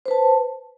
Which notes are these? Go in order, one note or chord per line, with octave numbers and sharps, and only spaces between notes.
B4 C5 A5